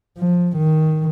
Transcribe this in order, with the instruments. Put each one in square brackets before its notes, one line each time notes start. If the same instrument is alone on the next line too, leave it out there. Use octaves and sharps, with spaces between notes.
[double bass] F3
D#3